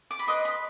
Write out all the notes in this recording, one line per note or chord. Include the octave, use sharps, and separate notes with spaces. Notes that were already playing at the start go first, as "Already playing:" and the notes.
D6
B5
B4 D#5 C6
B5